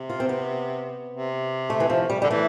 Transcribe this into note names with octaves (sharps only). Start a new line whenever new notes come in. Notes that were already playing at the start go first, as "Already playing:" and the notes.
Already playing: C3
F4
C4
B3
C3
A3
E3
F3
G3
D3 G3
E3 A3